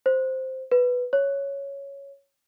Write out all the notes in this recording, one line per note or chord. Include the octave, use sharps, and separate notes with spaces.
C5
B4
C#5